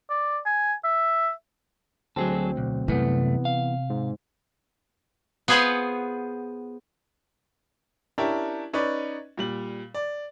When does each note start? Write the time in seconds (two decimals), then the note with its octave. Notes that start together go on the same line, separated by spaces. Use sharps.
0.10 D5
0.46 G#5
0.84 E5
2.16 D2 F#3 C4 G#4 A4
2.57 B1
2.88 C2 F#2 C3 E3 A3 B3
3.45 F5
3.90 G#2
5.48 B3 F4 G#4 B4 C5 F#5
8.18 C#4 D4 E4 G4 A#4
8.73 C#4 D#4 B4 D5
9.37 A#2 G3 F#7
9.95 D5